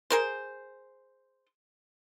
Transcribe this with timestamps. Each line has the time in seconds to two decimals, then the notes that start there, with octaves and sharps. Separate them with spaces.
0.10 G#4 A#4 C5